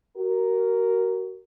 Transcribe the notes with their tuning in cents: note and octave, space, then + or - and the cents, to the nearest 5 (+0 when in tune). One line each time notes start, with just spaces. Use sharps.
F#4 +30 A#4 +0